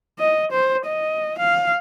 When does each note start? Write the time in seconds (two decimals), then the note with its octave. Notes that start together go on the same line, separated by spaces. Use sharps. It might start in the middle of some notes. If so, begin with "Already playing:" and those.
0.19 D#5
0.51 C5
0.86 D#5
1.38 F5